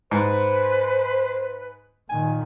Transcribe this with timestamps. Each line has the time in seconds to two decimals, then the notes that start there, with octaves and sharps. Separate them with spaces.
0.11 G#2 B4 C5
2.09 A#2 D#3 G#5